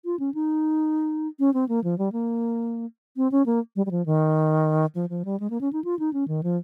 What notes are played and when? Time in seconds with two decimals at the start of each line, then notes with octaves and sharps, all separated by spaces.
0.05 F4
0.19 C#4
0.34 D#4
1.39 C#4
1.54 C4
1.69 A#3
1.84 F3
1.98 G3
2.12 A#3
3.17 C4
3.32 C#4
3.46 A#3
3.76 G3
3.86 G3
3.91 F3
4.06 D#3
4.95 F3
5.10 F3
5.25 G3
5.40 G#3
5.50 A#3
5.61 C#4
5.73 D#4
5.84 F4
5.99 D#4
6.13 C#4
6.28 D#3
6.43 F3